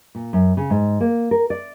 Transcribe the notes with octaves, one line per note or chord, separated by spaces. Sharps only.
A#2
F#2
C#3
G#2
A#3
A#4
D5